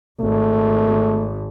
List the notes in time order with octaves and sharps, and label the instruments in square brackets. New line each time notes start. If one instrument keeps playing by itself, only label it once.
[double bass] G#1 [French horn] A3